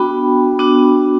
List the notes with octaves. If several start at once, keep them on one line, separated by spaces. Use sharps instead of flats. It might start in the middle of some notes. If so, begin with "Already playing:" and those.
Already playing: B3 D4 F#4 G5 B5
B3 D4 F#4